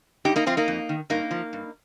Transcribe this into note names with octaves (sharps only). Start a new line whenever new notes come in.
G2 D#4 G4
A#3 D#4
F3 C4 F4
A#3 D#4
F2
D#3
G2 A#3 D#4
F3
G2